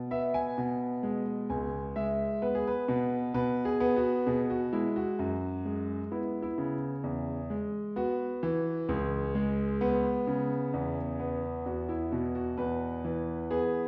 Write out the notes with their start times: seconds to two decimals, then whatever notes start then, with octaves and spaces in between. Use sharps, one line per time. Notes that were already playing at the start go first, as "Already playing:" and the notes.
Already playing: B2
0.11 B3 E5
0.34 G#5
0.58 B2
1.03 G#3
1.50 C#2 G#5
1.96 G#3 E5
2.42 B3 B4
2.55 G#4
2.67 B4
2.88 B2
3.34 B2 B4
3.65 G#4
3.80 B3
3.97 F#4
4.26 B2 G#4
4.50 F#4
4.73 G#3 E4
4.96 F#4
5.19 F#2
5.65 G#3
6.12 B3 E4
6.42 E4
6.58 C#3
7.04 E2
7.50 G#3
7.96 B3 F#4
8.43 E3
8.89 C#2 G#4
9.35 G#3
9.81 B3
10.27 C#3
10.74 E2
11.20 B3
11.66 E2 F#4
11.89 E4
12.12 B2 F#4
12.35 F#4
12.58 E2 B4
13.05 E3
13.51 B3 G#4